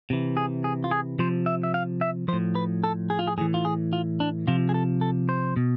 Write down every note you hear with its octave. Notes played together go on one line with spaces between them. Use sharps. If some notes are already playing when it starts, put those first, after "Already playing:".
C3 E3
G#4
G#4
F4
G#4
C3 F3 C5
E5
E5
F5
E5
A2 F3 C5
B4
A4
G#4
F4
G#4
A2 E3 G#4
F4
G#4
F4
D4
C3 F3 F4
G#4
A4
A4
C5
B2